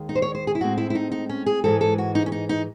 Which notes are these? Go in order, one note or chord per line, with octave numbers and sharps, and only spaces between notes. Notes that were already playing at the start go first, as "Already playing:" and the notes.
Already playing: D#2 D#3 G#3
D#4
C5
C#5
C5
G#4
E4
A2 G#3 C4 F#4
E4
E4
D#4
D#4
C#4
G#4
G#2 E3 G#3 A4
A4
F#4
D#4
C#4
D#4
D#4